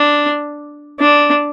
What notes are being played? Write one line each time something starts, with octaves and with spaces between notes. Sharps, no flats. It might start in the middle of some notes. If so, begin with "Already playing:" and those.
Already playing: D4
D4